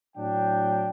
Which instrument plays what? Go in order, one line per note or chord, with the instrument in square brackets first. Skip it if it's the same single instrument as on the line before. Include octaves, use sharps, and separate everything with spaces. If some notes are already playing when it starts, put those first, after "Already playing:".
[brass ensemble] A2 F#3 D4 G5